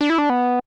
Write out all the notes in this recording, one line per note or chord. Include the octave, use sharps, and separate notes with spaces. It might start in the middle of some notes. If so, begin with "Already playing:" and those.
D4
E4
D4
B3